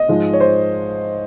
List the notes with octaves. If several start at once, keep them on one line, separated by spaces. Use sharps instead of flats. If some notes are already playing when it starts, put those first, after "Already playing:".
Already playing: D#5
G#2 F3 G#3
C#5
C5